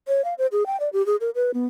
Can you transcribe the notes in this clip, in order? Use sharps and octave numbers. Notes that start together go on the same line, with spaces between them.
C#5
F5
C5
G#4
G5
D5
G4
G#4
A#4
B4
B3